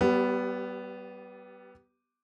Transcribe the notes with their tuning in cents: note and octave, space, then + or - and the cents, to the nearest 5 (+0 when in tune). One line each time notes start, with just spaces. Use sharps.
G3 -30 B3 +0 G4 +0